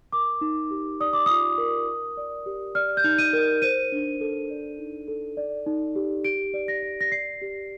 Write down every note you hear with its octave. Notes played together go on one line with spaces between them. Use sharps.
A#4 D6
D#4
G4
D5 D#6
D6
F4 D#6
A#4
A#4
D5
G4
D5 F6
G6
D#4
D#7
A#4
C5 D#7
D4
A4
D5
D#4
A4
D5
D#4
G4
G4 D7
D5
A#6
D5
A#6
D5 C7
G4